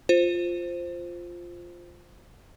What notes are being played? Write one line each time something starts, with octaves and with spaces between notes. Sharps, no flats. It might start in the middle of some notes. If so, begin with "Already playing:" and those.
F4 C5